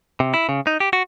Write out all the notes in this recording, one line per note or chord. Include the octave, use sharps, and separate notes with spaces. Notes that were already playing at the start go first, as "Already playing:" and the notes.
C3
E4
C#3
D#4
G4
F#4